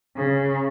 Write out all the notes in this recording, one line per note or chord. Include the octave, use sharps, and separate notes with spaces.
C#3